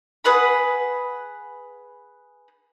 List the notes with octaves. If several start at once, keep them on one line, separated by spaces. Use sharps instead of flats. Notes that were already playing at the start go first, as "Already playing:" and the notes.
G#4 B4 F#5 B5